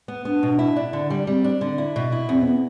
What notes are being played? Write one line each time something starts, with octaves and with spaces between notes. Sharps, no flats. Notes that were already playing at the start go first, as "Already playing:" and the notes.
B3
B3 D4
B2
E4
D4
D3
G3
G3 C4
D4
D3
E4
B2
E4
E2 C4
B3